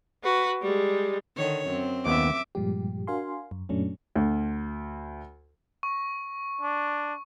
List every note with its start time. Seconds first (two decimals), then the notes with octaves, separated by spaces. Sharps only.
0.24 F#4 B4
0.62 G3 G#3
1.37 D3 D#3 C#5
1.68 F#2 C4
2.05 D#2 B3 E5 D6
2.55 G2 A#2 F3 G3 G#3 G4
3.07 D4 F#4 A#4 F5 G#5 C6
3.51 F#2
3.69 F#2 A#2 F#3 A3 C#4 D4
4.16 D2
5.83 C#6
6.61 D4